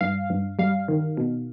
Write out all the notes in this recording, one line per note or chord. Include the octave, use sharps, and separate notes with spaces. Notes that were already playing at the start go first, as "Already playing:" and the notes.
G2 F5
G2
G3 F5
D#3
B2